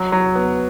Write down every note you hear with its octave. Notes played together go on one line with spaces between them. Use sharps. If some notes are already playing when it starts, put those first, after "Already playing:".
Already playing: F#3
F#3
B3